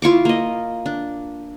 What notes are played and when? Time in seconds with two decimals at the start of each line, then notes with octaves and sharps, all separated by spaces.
0.02 E4 F4 C#6 D6
0.25 A#3 D#5
0.86 D4